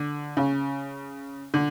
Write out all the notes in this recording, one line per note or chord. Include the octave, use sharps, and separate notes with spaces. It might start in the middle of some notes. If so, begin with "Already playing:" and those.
Already playing: D3
C#3
D3